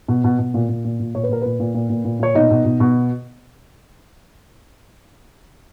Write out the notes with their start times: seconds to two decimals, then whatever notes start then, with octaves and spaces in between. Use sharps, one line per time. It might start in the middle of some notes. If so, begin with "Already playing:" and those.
0.08 B2
0.24 B2
0.39 B2
0.54 A#2
0.69 A#2
0.85 A#2
1.00 A#2
1.15 A#2 C#5
1.23 B4
1.29 A#2 A#4
1.42 A#2 B4
1.60 A#2
1.74 A#2
1.89 A#2
2.05 A#2
2.19 A#2 C#5
2.35 B2 D#4 D#5
2.51 B2
2.65 B2
2.80 B2